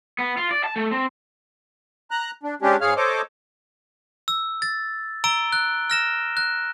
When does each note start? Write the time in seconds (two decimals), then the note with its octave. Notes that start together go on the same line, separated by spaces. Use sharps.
0.19 B3
0.37 F4
0.51 D5
0.64 A5
0.76 A3
0.91 C4
2.11 A#5 F#6
2.43 D4
2.62 G#3 C#4 D4 G4
2.81 G#2 G#3 G#4 C#5 F5 F6
2.96 A4 C5 C#5 D#5 D6
4.28 E6
4.62 A6
5.24 A#5 E6 D7 G7
5.52 F#6
5.90 F6 A#6 E7
6.37 F#6